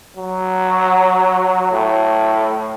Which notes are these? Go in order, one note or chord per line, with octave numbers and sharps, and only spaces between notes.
F#3
A2